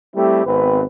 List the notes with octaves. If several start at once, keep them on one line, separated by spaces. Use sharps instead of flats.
G3 A3 C4 E4 G4
G#1 B3 C4 B4